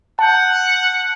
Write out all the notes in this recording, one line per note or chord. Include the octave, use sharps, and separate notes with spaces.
F#5 A5 G6